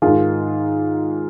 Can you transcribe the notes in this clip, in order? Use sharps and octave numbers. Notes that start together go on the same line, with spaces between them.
G#2 D#3 F4 G#4